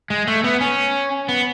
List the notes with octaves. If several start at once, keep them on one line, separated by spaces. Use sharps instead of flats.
G#3
A3
B3
C#4
B3